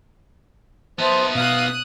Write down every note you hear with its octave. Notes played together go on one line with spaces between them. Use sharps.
B3 D#4 C5 E5 A5
B2 F5 D#6 F#6